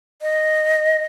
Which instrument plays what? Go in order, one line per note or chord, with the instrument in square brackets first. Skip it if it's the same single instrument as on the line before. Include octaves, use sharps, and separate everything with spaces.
[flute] D#5